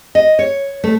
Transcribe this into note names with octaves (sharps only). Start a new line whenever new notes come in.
D#5
C#5
A3